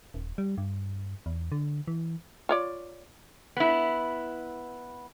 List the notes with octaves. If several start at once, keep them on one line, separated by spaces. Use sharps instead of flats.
D#1
G3
G2
E2
D3
E3
F4 C#5 D5
B3 E4